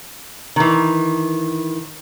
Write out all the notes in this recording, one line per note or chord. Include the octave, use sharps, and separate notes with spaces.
D#3 E3